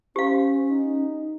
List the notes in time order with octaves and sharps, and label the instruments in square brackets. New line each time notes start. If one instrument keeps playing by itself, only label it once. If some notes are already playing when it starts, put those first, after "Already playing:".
[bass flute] C#4 [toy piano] G4 F5 [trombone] C5
[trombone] D#4